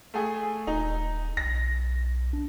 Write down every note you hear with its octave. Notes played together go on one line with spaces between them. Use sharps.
A3 G#4
D#1 D#4
B1 A#6
D4